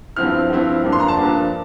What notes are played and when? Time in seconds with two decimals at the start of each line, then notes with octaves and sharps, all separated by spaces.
0.16 G2 F3 C4 E4 F6
0.50 G2 F3 C4 E4
0.84 G2 F3 A#3 D4
0.92 C6
1.00 A#5
1.08 A5
1.17 G2 F3 A#3 D4